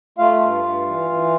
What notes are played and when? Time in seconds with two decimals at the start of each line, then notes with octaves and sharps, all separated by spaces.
0.18 A3 F4 F5
0.41 G2
0.64 G2
0.87 E3
1.10 E3